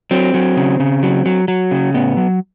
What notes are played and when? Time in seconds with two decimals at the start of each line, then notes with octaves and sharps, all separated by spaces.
0.11 F#3 C4
0.34 F#3
0.57 C#3
0.80 C#3
1.03 F#3
1.26 F#3
1.48 F#3
1.71 C#3
1.94 A2 B3
2.17 F#3